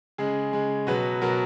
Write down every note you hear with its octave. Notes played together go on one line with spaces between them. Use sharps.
C#3 G#3 G#4
C#3 G#3
B2 F#3 B4
B2 F#3 A#4